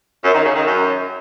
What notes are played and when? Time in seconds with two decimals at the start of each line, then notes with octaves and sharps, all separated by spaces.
0.24 F#2
0.35 D#3
0.45 C#3
0.55 D#3
0.66 F#2